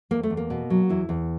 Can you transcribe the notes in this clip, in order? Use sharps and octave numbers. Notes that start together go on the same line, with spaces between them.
E2 A#3
A3
E2
A#3
B2
F#3
E2 E4
E2